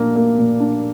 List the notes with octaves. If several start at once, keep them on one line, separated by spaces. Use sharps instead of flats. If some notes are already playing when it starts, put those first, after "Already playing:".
Already playing: A#2 A#3 D4
A#3
A#2
D4